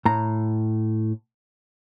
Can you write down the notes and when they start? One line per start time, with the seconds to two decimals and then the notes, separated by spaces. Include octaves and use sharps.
0.05 A2 A#5